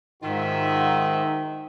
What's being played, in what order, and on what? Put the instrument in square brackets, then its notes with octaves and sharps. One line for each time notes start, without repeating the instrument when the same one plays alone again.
[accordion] G#2 [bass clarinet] D#3 [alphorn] D#4 [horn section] F4 F#4 E5